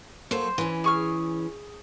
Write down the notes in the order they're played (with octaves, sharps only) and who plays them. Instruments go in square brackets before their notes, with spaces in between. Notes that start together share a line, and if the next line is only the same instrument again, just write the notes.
[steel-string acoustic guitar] F#3 A#3 A4 [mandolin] C5
[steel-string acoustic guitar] E3 C#4
[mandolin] G#4 C#6 F6